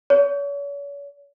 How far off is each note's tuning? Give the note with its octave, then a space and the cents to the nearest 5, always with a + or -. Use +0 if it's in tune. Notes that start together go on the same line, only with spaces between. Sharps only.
C#5 +40